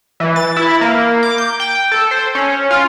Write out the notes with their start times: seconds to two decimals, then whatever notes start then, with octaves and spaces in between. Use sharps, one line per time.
0.20 E3
0.36 A6
0.56 E4
0.81 A#3
1.23 D6
1.38 G6
1.60 G5
1.92 A4
2.11 C5
2.35 C#4
2.71 F4